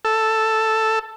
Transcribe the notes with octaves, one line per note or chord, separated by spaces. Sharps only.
A4